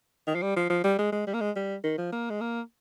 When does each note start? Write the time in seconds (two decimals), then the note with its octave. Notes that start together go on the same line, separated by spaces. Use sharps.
0.27 D#3
0.35 F3
0.42 G3
0.56 F3
0.70 F3
0.84 G3
0.98 G#3
1.12 G#3
1.27 G3
1.34 A#3
1.41 G#3
1.56 G3
1.84 D#3
1.98 F3
2.12 A#3
2.30 G#3
2.41 A#3